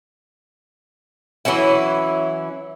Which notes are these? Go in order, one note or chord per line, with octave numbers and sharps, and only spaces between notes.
E3 F#3 C#4 E4